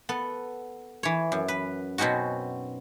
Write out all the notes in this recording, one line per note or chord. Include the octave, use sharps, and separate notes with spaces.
B3 A4
E3 C#5
F#2
B4
B2 C4 C#4 D#4 F#4